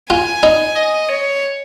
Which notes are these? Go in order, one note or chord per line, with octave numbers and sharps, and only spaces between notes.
F4 G#5
D#4
D#5
C#5